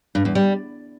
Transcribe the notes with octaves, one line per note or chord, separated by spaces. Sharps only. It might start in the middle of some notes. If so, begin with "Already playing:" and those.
G2
E2
G3